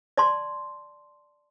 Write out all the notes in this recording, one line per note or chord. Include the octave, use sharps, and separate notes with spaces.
D5 A5 C6